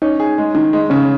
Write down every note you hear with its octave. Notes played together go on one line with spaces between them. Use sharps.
C#4 D#4
G#4
G#3
D#3
G#3
C#3 C#4